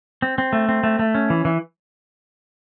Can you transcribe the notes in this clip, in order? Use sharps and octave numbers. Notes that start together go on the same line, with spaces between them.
C4
C4
A3
C4
A3
A3
C#4
E3
E3